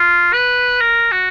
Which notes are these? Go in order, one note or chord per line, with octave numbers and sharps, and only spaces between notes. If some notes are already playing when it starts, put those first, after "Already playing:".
Already playing: F4
B4
A#4
F#4